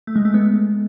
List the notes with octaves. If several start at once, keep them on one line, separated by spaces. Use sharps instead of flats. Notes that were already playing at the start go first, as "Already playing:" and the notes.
A3
G#3
A3
G#3 B3